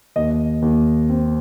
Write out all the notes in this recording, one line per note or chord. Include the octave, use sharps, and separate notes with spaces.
D#2 D#5
D#2
C4